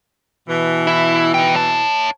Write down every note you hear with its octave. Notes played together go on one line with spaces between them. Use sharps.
B2 E3
E4
D#4 G5
C#5 A5